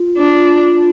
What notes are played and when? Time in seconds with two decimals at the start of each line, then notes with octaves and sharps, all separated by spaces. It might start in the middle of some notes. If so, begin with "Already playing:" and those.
Already playing: F4
0.18 D4